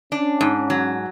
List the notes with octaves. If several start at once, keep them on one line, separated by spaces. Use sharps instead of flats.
C#4 D4
G#2
C#4
F#3